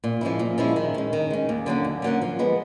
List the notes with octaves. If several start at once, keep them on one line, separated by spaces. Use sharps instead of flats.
A#2
F3 G#3 C#4 E4
A#2
F3 G#3 C#4 E4
D#3
G#3 C#4
D#3
G#3 C#4
D#2
D3 F#3 A#3 C#4
D#2
D3 F#3 A#3 C#4
F3
G#3 B3